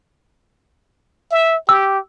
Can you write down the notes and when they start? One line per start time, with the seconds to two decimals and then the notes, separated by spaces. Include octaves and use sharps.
1.31 E5
1.69 G4 E6